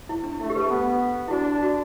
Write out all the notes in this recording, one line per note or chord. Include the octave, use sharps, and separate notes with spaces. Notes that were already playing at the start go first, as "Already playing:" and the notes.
E4
D4
A3 E4
G4
B4
A4
B3
E4
D4 F#4
F#4